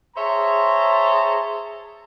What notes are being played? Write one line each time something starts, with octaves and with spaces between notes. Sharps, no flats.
G#4 C5 C#5 E5 A5 A#5